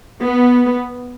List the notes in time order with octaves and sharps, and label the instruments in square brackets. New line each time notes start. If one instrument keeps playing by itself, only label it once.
[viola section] B3